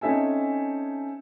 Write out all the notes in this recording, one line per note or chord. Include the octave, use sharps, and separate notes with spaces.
C4 C#4 D#4 A4 E5 G#5